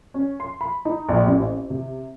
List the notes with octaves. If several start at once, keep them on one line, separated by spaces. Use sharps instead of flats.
C#4
C6
B5
D#4
A#1
A1
C4
C3